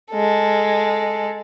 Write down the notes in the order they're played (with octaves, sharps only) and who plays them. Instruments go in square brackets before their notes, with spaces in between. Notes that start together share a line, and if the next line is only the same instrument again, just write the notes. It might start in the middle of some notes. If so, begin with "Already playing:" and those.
[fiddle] G#3 A4